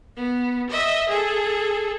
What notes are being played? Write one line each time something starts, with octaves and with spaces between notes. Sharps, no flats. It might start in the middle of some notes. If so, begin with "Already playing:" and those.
B3
D#5 E5
G#4 A4